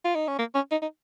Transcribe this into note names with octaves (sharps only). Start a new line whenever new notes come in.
F4
D#4
C#4
A#3
C#4
D#4
D#4